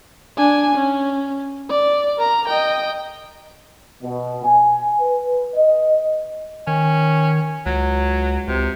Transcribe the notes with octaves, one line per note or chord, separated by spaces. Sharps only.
D4 G#5
C#4
D5
A#4 A#5
D#5 G5
B2
G#5
B4
D#5
D#3 C#4
C#2 F#3
C#2 C3